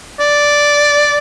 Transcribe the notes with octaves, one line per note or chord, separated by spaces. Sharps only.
D5